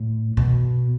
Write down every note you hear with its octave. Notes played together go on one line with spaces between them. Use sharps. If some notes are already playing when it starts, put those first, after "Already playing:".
Already playing: A2
B2